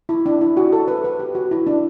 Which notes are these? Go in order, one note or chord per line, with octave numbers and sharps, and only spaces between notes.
E4
D4
E4
F#4
A4
B4
B4
G4
F#4
E4
D4